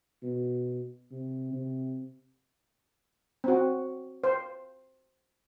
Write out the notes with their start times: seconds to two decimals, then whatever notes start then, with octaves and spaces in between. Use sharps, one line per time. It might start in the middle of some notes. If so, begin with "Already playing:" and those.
0.23 B2
1.11 C3
1.53 C3
3.44 C4 F#4
4.24 C5